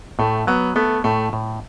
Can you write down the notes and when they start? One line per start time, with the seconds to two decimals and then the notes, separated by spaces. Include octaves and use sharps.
0.19 A2 A3
0.47 F#3 B3
0.76 A3 B3
1.04 A2 A3
1.33 A2